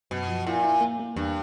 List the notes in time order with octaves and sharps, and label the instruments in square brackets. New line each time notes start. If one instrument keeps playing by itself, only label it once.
[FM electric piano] F#2 [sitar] B2
[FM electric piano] F3
[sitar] A#2 [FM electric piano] E4
[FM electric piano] E4
A#3
A#3
[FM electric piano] E2 [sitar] G2